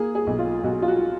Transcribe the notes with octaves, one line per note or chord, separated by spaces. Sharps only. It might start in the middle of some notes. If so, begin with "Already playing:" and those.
Already playing: A#3 G#4
G#4
B1
F4
B1 F#4
F4
F#4